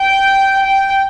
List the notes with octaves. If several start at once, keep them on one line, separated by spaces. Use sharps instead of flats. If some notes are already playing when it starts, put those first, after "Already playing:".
Already playing: G5
G5